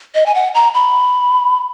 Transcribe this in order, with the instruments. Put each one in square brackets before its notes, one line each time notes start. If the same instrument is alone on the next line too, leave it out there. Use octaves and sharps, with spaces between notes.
[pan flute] D#5
G#5
F#5
A#5
B5